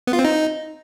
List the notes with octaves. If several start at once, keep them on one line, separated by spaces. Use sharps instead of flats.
B3
F4
C4
D#4